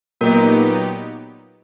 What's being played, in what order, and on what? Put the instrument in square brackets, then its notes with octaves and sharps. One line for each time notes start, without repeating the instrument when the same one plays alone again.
[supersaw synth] A#2 F#3 B3 D#4 G4 [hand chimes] A#3 A#4